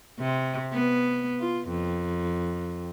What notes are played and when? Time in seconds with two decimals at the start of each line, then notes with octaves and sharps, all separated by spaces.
0.19 C3
0.73 B3
1.40 F4
1.69 F2